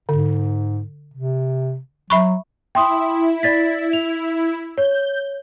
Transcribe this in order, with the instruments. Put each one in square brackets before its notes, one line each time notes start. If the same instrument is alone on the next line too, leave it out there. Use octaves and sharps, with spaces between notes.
[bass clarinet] G#2 [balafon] D3
[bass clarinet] C3
[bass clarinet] F#3 [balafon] E5 B5 C#6
[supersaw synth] E4 [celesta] G5 C6 D#6
[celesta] D5 A6 B6
F7
[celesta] C#5 [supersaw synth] G6